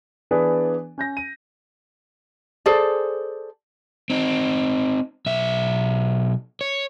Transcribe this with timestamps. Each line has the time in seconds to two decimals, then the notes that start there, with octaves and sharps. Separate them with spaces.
0.31 E3 B3 D4 G#4 B4 D5
0.98 C#4 G6 A#6
1.17 D#7
2.66 G#4 A4 C5 D5
4.10 C4 D#4
5.26 B1 E5
6.61 C#5